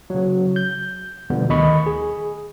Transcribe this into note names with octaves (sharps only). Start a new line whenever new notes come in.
C#3 F#3
G6
B2 D3 F3 G3 B3
D2 D#3 D#5 B5 C#6
G#4